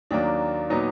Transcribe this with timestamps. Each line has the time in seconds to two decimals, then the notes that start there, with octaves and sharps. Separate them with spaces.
0.11 D#2 D#3 F#3 A#3 D4
0.70 A#2 F#3 B3 D#4